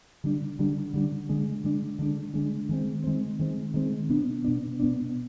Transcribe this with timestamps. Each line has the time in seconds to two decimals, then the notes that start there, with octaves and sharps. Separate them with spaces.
0.24 D3 G3 D4
0.59 D3 G3 D4
0.94 D3 G3 D4
1.29 D3 G#3 D4
1.64 D3 G#3 D4
1.99 D3 G#3 D4
2.34 D3 G#3 D4
2.69 D#3 G#3 C4
3.04 D#3 G#3 C4
3.39 D#3 G#3 C4
3.74 D#3 G#3 C4
4.09 B2 B3 D4
4.44 B2 B3 D4
4.80 B2 B3 D4